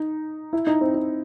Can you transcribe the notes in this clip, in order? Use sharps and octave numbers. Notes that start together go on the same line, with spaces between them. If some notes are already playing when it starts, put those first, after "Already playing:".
Already playing: D#4
E4
D#4
C4
D#4